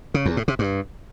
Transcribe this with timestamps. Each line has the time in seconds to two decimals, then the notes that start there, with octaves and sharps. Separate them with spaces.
0.14 C#3
0.26 E2
0.37 A2
0.48 C3
0.59 G2